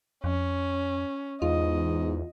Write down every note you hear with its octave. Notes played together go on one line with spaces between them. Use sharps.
F2 C#4
E2 G#2 F4 D#5